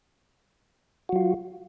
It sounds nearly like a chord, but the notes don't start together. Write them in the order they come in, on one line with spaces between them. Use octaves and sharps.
F#4 F#3 F4